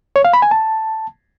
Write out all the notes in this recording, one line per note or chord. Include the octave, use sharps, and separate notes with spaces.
C#5
F5
B5
G#5
A5